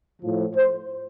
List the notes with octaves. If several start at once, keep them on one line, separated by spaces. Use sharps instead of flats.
A2 F3
C5